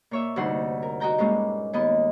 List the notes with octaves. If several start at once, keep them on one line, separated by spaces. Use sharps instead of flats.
A#2 C#5 E5
D2 G2 C3 D#4 F#5 C6
A#4
F#4 D#5 G5 A#5 G6
G2 A#2 G#3 C#4
D#2 B3 D#5